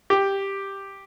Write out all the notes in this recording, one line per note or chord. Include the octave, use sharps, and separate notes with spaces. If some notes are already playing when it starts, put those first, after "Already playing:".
G4